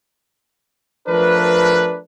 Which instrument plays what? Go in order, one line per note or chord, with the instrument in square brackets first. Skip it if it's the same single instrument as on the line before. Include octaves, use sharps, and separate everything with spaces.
[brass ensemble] F3 A3 D4 A#4 B4